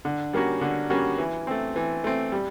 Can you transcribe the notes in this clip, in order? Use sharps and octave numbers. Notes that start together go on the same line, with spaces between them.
D3
G3 A#3 C#4 F#4
D3
G3 A#3 C#4 F#4
E3
A3 C4
E3
A3 C4
G3